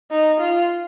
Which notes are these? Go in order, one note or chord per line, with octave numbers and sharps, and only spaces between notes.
D#4
F4